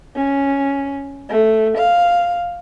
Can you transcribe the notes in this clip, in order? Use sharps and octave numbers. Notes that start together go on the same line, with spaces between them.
C#4
A3
F5